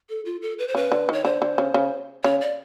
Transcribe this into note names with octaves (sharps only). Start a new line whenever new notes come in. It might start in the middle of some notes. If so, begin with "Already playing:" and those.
A4
F4
A4
B4
C5
C#3 B4
D3
D#3 C#5
D3 C5
D3
C#3
C#3
C#3 C#5
D5